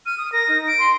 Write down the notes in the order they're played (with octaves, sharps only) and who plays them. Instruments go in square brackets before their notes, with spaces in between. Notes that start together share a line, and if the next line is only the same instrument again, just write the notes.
[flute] F6 [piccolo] D#7
[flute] D#6
[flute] A#4 [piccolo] A#6
[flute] D#4
[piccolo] D7
[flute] C6